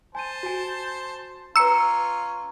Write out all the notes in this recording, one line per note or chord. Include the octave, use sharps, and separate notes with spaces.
C5 G#5 A5 D#7
F#4 G#5
C#4 F4 B4 A#5 E6 C#7